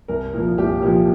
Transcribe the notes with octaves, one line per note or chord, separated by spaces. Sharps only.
C2 A#4
A#2 F3 A#4
C2 G4
A#2 F3 G4